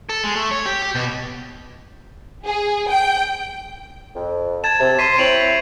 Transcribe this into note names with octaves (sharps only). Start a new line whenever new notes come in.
A4
G#3
A3
C#5
G4
G4
B2
G#4
G5
F2
A5 G#6 A6 E7
C3
C6 B6 C7 D#7
C4 E4 C#5 D7 F7 F#7